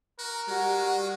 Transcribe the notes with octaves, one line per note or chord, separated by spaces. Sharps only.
F#4 A#4
G3 G#3 F#4